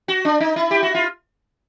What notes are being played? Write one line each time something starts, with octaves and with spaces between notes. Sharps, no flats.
F#4
D4
D#4
E4
G4
F#4
F4